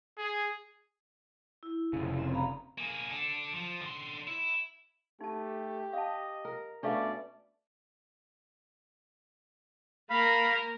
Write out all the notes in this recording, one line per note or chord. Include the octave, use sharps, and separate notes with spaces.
G#4
E4
F1 C#3
C4
F5 A#5 B5
A#3 G#4
D4 A4
F3
D3 C6
E4
A3 D#4 G4 A5
D#5 F5 A5
A#4
B2 A3 C#4 D4 D5 F5
A#3 A#4 F5 B5